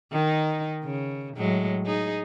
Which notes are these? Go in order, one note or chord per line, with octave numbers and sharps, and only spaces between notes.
D#3 D#4
C#3
A2 F#3 G#3
D#4 G#4